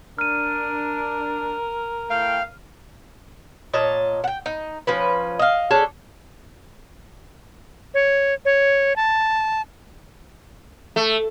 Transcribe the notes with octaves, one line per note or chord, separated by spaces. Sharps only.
D4 A#4 F6 D#7
A3 E4 F5 G5
A#2 C#5 D#5 A5
F#5 G5
D#4
F3 C#4 B4
D#5 F5
C#4 D4 G#4 A4
C#5
C#5
A5
A3